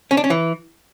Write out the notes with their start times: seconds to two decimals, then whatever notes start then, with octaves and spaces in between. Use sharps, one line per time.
0.11 C#4
0.17 D4
0.24 C#4
0.30 E3